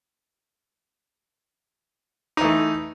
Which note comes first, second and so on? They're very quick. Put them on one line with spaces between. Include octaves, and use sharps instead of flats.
D#4 E3 A3